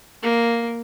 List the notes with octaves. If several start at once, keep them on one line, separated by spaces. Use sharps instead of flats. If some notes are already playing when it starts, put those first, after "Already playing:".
A#3